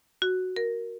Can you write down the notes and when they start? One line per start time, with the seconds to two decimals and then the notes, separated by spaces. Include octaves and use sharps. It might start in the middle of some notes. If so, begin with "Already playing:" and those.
0.22 F#4
0.56 A#4